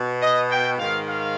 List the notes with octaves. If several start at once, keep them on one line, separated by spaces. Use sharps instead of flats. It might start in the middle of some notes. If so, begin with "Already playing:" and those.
Already playing: B2
D#5
G5
G#2 D#3 F5
F5